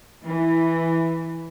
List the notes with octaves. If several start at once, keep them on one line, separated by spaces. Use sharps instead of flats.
E3